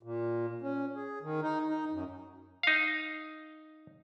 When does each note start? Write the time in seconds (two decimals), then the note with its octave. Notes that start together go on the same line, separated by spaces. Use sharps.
0.03 A#2
0.62 C#4
0.96 G#4
1.22 D#3
1.42 D#4
1.68 D#4
1.92 F#2
2.63 D#4 F5